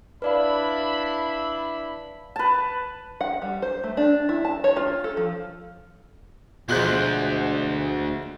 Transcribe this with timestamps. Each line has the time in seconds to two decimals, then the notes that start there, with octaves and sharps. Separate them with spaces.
0.22 D4 E4 B4 D5 F5 B5
2.36 B4 A5
3.21 F#5
3.42 G3
3.62 C5
3.84 A3
3.97 D4
4.29 E4
4.45 A5
4.64 C#5
4.77 F4
5.04 A4
5.17 F3
6.69 D2 B2 F3 G#3 F4 F#6 G6